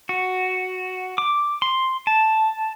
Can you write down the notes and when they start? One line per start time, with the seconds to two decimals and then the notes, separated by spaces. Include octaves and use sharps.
0.09 F#4
1.18 D6
1.62 C6
2.07 A5